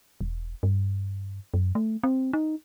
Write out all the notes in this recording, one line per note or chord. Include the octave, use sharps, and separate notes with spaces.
E1
G2
F#2
A3
C4
D#4